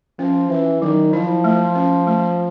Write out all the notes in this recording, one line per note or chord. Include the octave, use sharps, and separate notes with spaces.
F3 C#4
E3 C#4
D#3 F#3
F3 E4
A3
C#4
A3